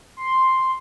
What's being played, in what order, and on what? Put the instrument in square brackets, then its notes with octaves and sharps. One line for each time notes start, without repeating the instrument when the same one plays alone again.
[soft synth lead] C6